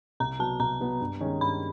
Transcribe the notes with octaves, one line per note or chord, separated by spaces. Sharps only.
C2 A#5
B2 F#3 B3 A5
C2 A#5
B2 F#3 B3
G2
D#3 G#3 C#4
G2 B5